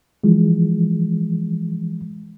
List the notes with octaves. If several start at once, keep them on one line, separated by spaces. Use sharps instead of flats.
E3 F3 G#3